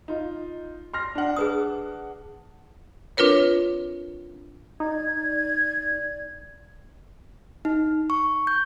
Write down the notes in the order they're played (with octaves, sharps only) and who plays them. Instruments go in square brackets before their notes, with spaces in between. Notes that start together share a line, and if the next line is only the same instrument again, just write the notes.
[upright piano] D#4 F4
C6 F6 A#6
D4 F#5
[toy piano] G#4 B4 D#6
[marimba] C4 D4 F4 A#4 B4 C#5
[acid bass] D#4 [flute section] D5 G#6
[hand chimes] D#4
C#6
G6